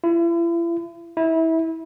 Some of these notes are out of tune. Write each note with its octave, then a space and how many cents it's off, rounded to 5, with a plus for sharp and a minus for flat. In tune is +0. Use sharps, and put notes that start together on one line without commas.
E4 +40
E4 -25